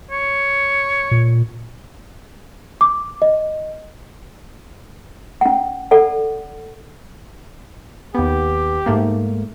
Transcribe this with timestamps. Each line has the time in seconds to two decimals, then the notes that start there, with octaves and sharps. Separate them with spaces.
0.11 C#5
1.11 A#2
2.81 D6
3.22 D#5
5.41 C#4 F#5
5.91 A4 D5 F#5
8.14 D#2 B3 G4
8.86 G#2 A3 A#3